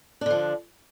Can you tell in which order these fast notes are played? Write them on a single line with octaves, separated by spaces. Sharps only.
D4 D3 F3